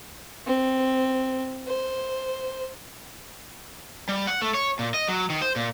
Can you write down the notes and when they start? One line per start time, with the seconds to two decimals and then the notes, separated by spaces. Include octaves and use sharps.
0.46 C4
1.67 C5
4.09 G3
4.27 F#5
4.42 A3
4.54 C#5
4.79 A#2
4.94 D#5
5.08 F#3
5.30 D#3
5.42 C5
5.56 A#2